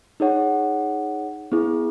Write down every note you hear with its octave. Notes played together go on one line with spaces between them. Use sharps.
D#4 G#4 C#5 F#5
B3 E4 G#4